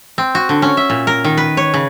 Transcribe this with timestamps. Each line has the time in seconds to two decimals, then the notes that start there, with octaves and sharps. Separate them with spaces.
0.18 C4
0.35 F#4
0.49 D3
0.62 C#4
0.77 E5
0.90 A#2
1.07 A#4
1.24 D#3
1.37 B4
1.57 C#5
1.74 C#3